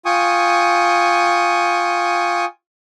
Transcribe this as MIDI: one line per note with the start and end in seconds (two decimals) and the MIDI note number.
0.06 2.45 65
0.06 2.45 79
0.06 2.45 80
0.06 2.45 85
0.06 2.45 87